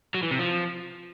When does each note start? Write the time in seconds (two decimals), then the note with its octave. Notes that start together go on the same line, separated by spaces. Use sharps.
0.14 F#3
0.23 E3
0.31 C3
0.39 F3